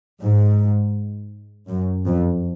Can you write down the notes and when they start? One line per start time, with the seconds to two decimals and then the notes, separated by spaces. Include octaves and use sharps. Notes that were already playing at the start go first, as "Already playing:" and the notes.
0.23 G#2
1.68 F#2
2.06 F2